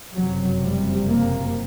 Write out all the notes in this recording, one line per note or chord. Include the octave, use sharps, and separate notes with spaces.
F#1 F2 C3 F#3
G3
A#3